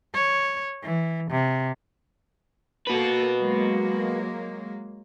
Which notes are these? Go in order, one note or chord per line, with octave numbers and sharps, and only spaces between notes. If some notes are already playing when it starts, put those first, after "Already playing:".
C#5
E3
C3
A#3 F#4 A4 B4
F#3 G#3 A#3